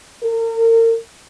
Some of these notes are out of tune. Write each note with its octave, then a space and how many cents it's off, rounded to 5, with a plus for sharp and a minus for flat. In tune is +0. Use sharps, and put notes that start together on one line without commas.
A#4 -35